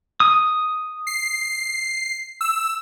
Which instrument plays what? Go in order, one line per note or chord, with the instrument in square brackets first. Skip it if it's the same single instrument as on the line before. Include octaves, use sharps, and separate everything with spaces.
[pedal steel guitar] D#6
[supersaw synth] C7
E6